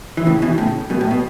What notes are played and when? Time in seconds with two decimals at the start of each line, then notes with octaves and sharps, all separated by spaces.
0.17 E3
0.26 A2 C#3
0.42 B2 E3
0.58 A2 C#3
0.90 F#2 B2
1.01 A2
1.11 B2